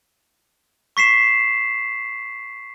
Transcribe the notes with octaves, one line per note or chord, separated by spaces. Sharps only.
C#6 B6 C7 E7